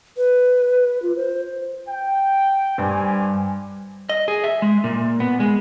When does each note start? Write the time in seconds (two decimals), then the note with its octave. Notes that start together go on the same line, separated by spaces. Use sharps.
0.17 B4
1.02 F4
1.16 C5
1.87 G5
2.78 G2 D4 C5 G#5
4.09 D#5
4.28 G#4
4.44 E5
4.62 G#3
4.84 A#2
5.20 B3
5.40 G#3